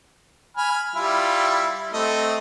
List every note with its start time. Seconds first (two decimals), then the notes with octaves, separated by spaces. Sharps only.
0.57 G#5 B5 F6
0.96 G3 E4 F4
1.93 A3 C4 D#5